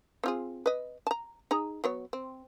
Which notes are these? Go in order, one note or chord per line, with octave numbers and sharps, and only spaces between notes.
C4 F4 G#4
B4 D#5
A5 A#5
D#4 G#4 A#5
F#3 B3 C#5
C4